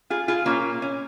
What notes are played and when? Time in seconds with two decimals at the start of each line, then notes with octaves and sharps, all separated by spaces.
0.10 F4 G#4
0.28 F4 G#4
0.46 A#2 F#3 A#3 C#4 F4
0.82 C#4